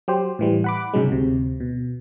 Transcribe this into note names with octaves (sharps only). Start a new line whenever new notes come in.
F#3 G4 C5
A2 E3 G3
F#5 B5 D6
C2 G#2 C#3 F#3 G#3
D2 C3
B2